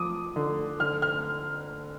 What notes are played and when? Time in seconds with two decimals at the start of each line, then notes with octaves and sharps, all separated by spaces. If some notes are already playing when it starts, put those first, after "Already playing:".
Already playing: F3 D6 D#6
0.36 D3
0.80 D3 F6
1.02 F6